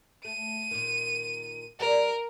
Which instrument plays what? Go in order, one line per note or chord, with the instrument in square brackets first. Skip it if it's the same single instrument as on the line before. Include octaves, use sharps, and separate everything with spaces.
[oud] A3 [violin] D#7
[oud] A#2 D#3
[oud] G3 D5 [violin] A#4